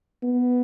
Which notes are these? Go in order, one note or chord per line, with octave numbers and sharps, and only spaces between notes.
B3